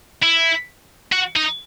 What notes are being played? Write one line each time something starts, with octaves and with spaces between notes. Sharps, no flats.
E4
F#4
D#4